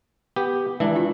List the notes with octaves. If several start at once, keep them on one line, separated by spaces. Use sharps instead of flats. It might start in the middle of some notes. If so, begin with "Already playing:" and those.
B3 G4
D#3 E3 G#3 D4
F4